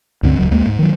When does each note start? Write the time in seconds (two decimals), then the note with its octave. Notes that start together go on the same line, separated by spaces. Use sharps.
0.23 C#2 G2 D3 C4
0.39 D1 C#2 F#3
0.51 D2 G#3 A#3
0.67 G#2
0.79 D#3 F#3